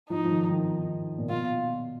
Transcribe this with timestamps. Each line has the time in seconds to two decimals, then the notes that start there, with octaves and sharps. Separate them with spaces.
0.09 F3 D#4
0.24 F3
0.30 D#3
0.50 D#3
1.18 A#2
1.29 B2 F4